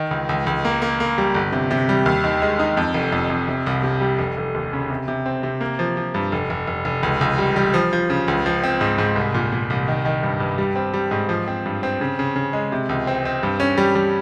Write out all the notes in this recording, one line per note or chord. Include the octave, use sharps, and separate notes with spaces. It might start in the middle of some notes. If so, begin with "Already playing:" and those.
Already playing: D#3
C#2
C#2
C#2
A#3
A#3
A#3
G3
G1
C3
C3
G3
D#2
D#3
G#3
D#4
F2
F1
F2
F2
C3
C2
C3
G3
F1
F1
D#2
C#3
C3
C3
C4
C3
A#3
F3
F3
G2
F1
F1
F1
F1
C#2
C#2
G3
G3
F3
F3
C#3
C#2
F3
C4
G#2
G#2
C2
A#2
A#2
C2
D#3
D#3
G2
G2
G3
C4
G3
G#2
F3
C4
G2
C4
C#3
C#3
C#3
G#3
C3
C#2
C4
C4
G2
C#4
G3
G3